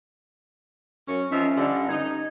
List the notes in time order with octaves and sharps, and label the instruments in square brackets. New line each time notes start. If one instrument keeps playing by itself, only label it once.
[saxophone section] F#2 C#4
[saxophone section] F3 D#4 E5 [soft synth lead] C#4
[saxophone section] G2 D3
[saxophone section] D#4 [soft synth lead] G#6